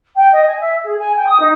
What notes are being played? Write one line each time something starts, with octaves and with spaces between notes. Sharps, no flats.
G5
D#5
G#5
E5
G#4
G#5
G5
D#6
D#4